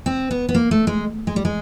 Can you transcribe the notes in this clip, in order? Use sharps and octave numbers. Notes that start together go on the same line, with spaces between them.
C4
B3
B3
A#3
A3
G#3
G#3
G3
G#3